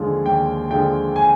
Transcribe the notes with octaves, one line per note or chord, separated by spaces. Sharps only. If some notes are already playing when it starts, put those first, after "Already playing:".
Already playing: D#2 D3 F3 G#3
D#2 G5
D3 F3 G#3 G5
G#5